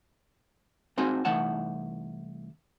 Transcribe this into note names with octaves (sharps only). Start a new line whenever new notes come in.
A#3 C4 D#4 F#4 G#5
C2 E3 A3 D#4 F#5 A5